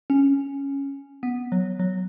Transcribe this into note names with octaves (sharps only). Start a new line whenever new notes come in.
C#4
B3
F#3
F#3